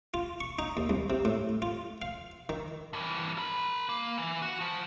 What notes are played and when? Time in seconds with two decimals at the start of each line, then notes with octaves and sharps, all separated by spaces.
0.14 F4
0.41 C#6
0.59 D#4
0.77 D#2
0.90 C2
1.10 C3
1.25 A2
1.62 F4
2.02 F5
2.49 D#3
2.93 G2 E3
3.38 A#4 B5
3.89 A#3
4.18 E3
4.42 F#4
4.61 F3